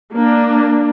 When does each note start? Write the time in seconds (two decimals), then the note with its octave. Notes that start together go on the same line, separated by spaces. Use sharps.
0.14 A#3 D4